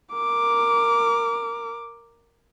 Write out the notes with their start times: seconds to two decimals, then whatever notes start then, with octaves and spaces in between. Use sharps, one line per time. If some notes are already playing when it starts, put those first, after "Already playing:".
0.13 A#4 D6